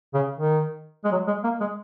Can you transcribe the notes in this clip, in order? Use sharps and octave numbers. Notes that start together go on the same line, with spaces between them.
C#3
D#3
G#3
F#3
G#3
A#3
G#3